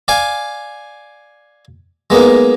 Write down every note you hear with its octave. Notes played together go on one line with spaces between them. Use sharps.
D5 F5 G#5
G#3 A#3 B3 D#4